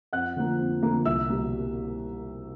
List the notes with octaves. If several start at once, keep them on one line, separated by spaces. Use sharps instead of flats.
F2 F#5 F#6
D3 F3 A#3
F2
D3 F3 A#3
C2 E5 E6
B2 G3 A#3